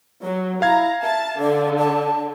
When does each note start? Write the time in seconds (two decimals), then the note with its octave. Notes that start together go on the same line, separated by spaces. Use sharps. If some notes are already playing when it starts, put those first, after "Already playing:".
0.23 F#3 C#5
0.62 E4 F5 A#5 G#6
1.02 E5 A5
1.40 D3 D5
1.78 A5